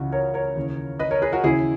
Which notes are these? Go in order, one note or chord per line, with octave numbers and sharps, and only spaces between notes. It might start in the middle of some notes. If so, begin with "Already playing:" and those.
Already playing: C#2 C#3 E3 F#4
A#4 C#5
A#4 C#5
D#2 C#3 E3
B4 D#5
A#4 C#5
G#4 B4
F#4 A#4
D#2 C#3 E3 E4 G#4